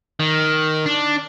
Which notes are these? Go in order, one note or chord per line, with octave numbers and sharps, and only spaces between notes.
D#3
D4